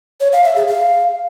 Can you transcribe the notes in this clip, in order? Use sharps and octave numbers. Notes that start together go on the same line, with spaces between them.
C#5
F5
E5
G#4
F5